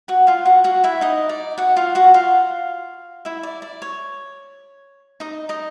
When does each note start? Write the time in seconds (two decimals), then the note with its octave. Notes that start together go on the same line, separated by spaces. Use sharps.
0.08 F#4 F#5
0.27 F4 F5
0.45 F#4 F#5
0.64 F#4 F#5
0.84 E4 E5
1.01 D#4 D#5
1.29 D5
1.58 F#4 F#5
1.76 F4 F5
1.95 F#4 F#5
2.14 F4 F5
3.25 E4 E5
3.43 D5
3.62 D5
3.82 C#5
5.20 D#4 D#5
5.49 D#4 D#5